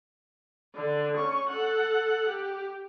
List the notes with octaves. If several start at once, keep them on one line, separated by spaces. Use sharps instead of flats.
D3 D4
C#4 C#6
A4 F#5
G4